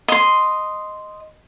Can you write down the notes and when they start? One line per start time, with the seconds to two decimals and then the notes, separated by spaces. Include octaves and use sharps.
0.08 D#5 C6